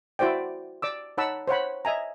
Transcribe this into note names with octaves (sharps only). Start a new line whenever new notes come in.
E4 F#4 C5 D5 G5
D5 D6 E6
D#4 C#5 F#5 A5 B5 E6
C5 C#5 F#5 B5
D#5 E5 G#5 A#5